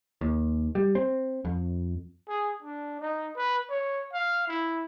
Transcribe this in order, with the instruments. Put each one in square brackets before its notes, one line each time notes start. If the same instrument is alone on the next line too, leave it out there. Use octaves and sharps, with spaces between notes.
[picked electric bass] D#2
G3
C4
F2
[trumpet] G#4
D4
D#4
B4
C#5
F5
E4